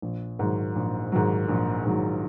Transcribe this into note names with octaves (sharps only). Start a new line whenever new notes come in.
A#1
G#2 D#3 F#3
A#1
G#2 D#3 F#3
A#1
G#2 D#3 F#3